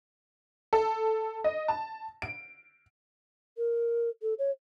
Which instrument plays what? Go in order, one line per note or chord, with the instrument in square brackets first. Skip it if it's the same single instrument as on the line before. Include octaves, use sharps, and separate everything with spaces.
[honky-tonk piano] A4
D#5
A5
D7
[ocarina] A#4
A4
C#5